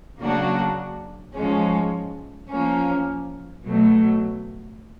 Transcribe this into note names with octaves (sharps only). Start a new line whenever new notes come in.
C#3 F#3 A#3 D4 F#4
G#2 F3 G#3 C#4
F3 A#3 C#4
B2 F#3 A3